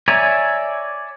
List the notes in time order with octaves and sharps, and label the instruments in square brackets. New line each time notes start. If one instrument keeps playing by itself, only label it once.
[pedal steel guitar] C#5 D5 E5 G#5 A#5